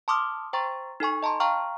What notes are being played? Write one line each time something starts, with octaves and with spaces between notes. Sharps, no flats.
A5 C6 D6 D#6 F6
C5 G5 A#5 C6 C#6 A6
D#4 A4 G#5 C#6
D#5 A5 A#5 C6
F5 G5 A#5 C#6 F6